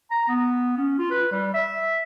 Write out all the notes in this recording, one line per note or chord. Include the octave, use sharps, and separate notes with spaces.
A#5
B3
C#4
F4
B4
G3
E5